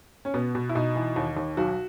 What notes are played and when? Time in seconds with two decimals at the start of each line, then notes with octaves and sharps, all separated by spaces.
0.25 C#4
0.34 B2 B3
0.55 B2
0.69 E4
0.75 B2 D#4
0.96 E3
1.16 D#2
1.37 D#2
1.57 B1 F#4